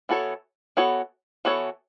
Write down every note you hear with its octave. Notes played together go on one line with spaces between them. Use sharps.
E3 B3 F#4 A4 C#5
E3 B3 F#4 A4 C#5
E3 B3 F#4 A4 C#5